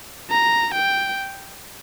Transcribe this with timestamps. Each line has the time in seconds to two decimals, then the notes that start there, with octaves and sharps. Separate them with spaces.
0.30 A#5
0.74 G5